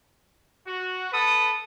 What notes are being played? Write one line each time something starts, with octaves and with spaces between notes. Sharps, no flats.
F#4
A4 B4 D#6